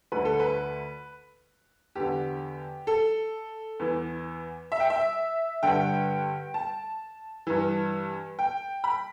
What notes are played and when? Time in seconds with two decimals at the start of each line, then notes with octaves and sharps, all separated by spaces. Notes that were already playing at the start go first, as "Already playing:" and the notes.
0.12 D2 D3 B4
0.25 A4
0.39 B4
1.95 E2 D3 G4
2.87 A4
3.79 E2 E3
4.72 E5
4.80 G5
4.90 E5
5.63 G2 D3 G5
6.54 A5
7.47 G2 E3
8.39 G5
8.84 B5